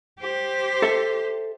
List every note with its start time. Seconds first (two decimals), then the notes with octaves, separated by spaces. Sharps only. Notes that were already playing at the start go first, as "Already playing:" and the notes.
0.20 G4 C5
0.82 A4 E5